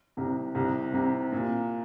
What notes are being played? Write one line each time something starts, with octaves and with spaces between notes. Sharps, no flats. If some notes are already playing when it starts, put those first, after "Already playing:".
C2 C3
C2 C3
C2 C3
A#2